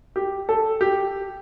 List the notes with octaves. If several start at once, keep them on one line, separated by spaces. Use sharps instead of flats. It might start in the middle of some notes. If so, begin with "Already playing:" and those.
G4
A4
G4